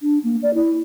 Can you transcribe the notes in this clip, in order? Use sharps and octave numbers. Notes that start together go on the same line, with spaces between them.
D4
A#3
D5
E4